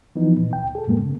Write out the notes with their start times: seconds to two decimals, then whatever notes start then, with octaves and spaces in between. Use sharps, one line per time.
0.16 E3 F3 B3 D#4
0.36 A#2
0.53 D2 G5
0.75 G#4 A4
0.87 F#2 A2 G#3 A#3 B3
0.99 C#3